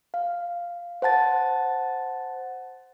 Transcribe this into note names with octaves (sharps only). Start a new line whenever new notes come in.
F5
C5 F#5 A5 A6